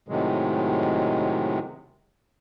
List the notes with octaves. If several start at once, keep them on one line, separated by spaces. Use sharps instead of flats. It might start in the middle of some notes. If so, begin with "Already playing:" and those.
A2 C3 D#3 F#3 G#3